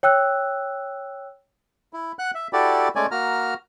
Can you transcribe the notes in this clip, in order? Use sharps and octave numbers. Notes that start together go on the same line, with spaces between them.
C#5 G5 E6 F#6
E4
F#5 F#6
E5
E4 F#4 G4 A4 D5
G#3 A3 C#4 D5 G#5
A#3 F#4 A#5 F6